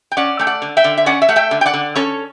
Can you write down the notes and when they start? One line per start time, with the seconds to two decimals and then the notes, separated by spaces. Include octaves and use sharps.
0.12 G5
0.17 C#4 D5 F#5
0.39 A3 G5
0.47 D5 F#5
0.62 D3
0.77 E5 G5
0.84 D3
0.98 E5
1.06 C#4 D5 F#5
1.22 E5
1.29 A3 F#5
1.36 E5 G5
1.51 D3
1.61 G5
1.66 D5 F#5
1.74 D3
1.95 C#4 A4 C#5